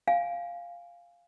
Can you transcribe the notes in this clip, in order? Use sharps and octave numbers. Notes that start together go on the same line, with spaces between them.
F5 G#5